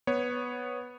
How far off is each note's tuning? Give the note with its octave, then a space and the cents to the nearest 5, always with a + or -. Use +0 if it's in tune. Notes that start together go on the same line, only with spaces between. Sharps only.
B3 -5 C#5 +0